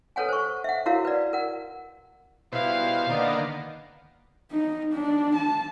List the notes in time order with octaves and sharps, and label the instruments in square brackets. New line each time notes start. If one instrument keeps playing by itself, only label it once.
[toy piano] A4 B4 C#5 F#5 G#5
C5 C#6
E5 F#5
E4 F#4 A#4 C#5 F5
B4 D5
A#4 F#5
[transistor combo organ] B2 C5 [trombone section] D#3 G3 E4 [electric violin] F5
[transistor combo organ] D3 D#3 A#3 [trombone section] B3
[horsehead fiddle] D#4
D4
A5